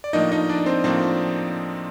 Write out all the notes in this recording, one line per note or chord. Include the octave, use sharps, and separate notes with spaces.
D5
A2 F3 A#3 D4 D#4 D#5
D#4 D#5
D4 D5
C4 C5
A2 F3 A#3 C4 D4 C5